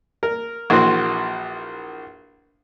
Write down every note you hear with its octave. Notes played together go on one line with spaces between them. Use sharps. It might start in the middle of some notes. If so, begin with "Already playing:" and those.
A#4
A#1 E3 A#3 F#4 C5